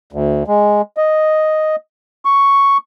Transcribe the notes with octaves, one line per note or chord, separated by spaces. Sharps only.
D2
G#3
D#5
C#6